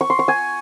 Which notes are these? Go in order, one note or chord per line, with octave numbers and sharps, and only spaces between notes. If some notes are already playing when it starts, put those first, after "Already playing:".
C#6
C6
C#6
G#5